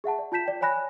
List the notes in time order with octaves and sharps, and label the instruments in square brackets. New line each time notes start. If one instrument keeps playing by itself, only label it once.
[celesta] G#4 E5 F#5 A5
D5
F4 A5 G6 B6 E7
D5 G5
C#5 D5 G#5 B5 F#6 A#6